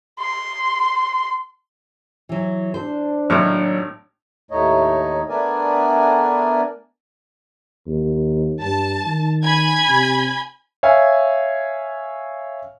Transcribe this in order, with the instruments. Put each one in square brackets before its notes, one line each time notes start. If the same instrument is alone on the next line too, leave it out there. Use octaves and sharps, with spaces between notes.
[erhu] C6
[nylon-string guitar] E3 F#3
[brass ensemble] D4 [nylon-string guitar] C5
[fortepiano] G#1 A2 F6 [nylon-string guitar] F#3 A#3 D#4
[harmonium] D#2 A2 A3 D#4 C#5 D#5
A3 B3 D4 A#4 D5 G#5
[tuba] D#2
[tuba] G2 [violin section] A5
[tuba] D#3
[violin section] G#5 B5 G#6
[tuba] C3
[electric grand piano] C#5 E5 F5 G#5